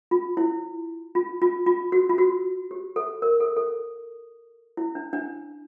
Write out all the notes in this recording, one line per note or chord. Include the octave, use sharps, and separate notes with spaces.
F4
E4
F4
F4
F4
F#4
F4
F#4
G4
A4
A#4
A4
A4
E4
D4
D4